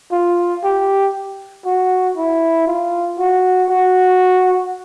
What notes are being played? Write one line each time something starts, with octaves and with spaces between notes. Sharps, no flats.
F4
G4
F#4
E4
F4
F#4
F#4